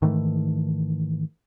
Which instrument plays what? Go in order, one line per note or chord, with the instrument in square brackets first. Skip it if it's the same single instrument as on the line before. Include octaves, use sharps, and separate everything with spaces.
[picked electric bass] G#2 D#3 E3 A3